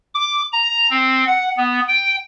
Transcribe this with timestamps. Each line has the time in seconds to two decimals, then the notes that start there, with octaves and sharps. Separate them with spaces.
0.14 D6
0.53 A#5
0.90 C4
1.27 F#5
1.57 B3
1.88 G5